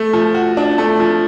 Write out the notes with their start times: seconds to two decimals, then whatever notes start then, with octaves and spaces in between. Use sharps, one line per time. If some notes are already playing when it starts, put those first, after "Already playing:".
Already playing: A3
0.13 F3
0.35 F#4
0.57 D4
0.78 A3
1.00 F3